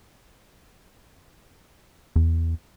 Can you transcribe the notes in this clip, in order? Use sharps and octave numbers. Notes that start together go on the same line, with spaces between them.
E2